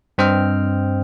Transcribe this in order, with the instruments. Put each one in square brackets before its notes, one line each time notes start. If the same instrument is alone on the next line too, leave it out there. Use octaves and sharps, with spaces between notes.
[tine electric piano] G2 C4 C5 D#5 G5 F6